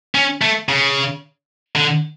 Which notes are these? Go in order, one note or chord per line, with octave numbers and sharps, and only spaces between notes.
C#4
A3
C#3
D3